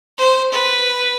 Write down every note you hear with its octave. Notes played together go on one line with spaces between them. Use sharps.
C5
B4